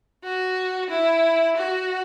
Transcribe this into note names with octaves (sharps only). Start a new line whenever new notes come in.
F#4
E4
F#4